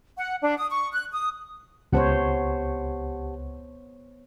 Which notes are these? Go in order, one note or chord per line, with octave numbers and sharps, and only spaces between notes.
F#5
D4
D#6
C#6
F#6
D#6
C#2 B3 G4 C5 C#5 F#5 A5